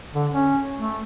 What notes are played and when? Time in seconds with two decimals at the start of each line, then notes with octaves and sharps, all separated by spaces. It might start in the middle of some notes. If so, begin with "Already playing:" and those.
0.15 D3
0.33 C#4
0.77 A3